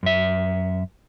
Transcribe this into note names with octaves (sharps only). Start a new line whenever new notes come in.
F#2 E5